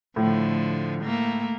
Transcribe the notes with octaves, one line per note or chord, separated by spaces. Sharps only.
A2 D3 F3
A3 A#3